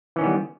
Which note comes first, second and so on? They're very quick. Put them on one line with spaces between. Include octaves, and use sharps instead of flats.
E3 C#4 D#3 B3 G3